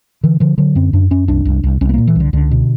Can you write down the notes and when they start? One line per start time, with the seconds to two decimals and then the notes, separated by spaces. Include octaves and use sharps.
0.23 D3 E3
0.40 D3 F3
0.58 D3 F#3
0.75 F#2 C4
0.93 F#2 D4
1.11 F#2 C#4
1.28 C2 D4
1.45 C2
1.64 C2
1.81 C2 C#4
1.89 B3
1.94 A#2 A#3
2.07 E3
2.15 C2 D3
2.33 C#2 D3
2.51 B2